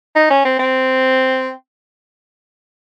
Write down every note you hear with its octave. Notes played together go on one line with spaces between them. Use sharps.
D#4
C#4
C4
C4